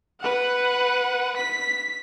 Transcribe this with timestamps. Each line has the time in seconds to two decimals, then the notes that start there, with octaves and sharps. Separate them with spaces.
0.21 B4 F#5
1.37 B6